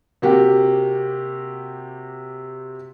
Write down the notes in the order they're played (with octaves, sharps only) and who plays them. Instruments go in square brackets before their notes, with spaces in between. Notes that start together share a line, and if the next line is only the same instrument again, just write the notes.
[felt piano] C3 A#3 F#4 G4